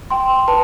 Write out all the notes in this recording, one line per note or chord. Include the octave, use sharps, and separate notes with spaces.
G5 C6
B4 A5